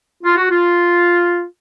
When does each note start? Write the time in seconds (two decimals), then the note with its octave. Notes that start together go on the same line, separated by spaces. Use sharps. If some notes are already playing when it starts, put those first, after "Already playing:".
0.24 F4
0.36 F#4
0.50 F4